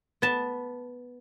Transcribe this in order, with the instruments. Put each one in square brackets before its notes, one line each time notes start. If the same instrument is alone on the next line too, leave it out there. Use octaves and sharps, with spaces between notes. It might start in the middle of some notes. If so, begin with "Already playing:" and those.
[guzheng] B3 A5